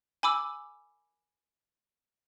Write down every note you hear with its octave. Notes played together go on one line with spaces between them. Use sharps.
G#5 B5 D6 E6